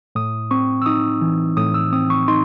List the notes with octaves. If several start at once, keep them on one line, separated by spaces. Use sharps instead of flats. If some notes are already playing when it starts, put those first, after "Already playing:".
A2 D#6
C4 C#6
E6
D#4 D#6
E3
A2 D#6
E6
C4 D#6
C#6
D#4 C6